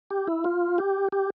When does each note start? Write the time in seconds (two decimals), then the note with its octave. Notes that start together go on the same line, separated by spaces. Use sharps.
0.11 G4
0.27 E4
0.44 F4
0.78 G4
1.12 G4